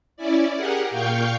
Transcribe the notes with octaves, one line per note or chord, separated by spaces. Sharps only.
C#4 E4 D5
G4 G#4 A#4 F#5
A#2 F5 G5 C#6 G6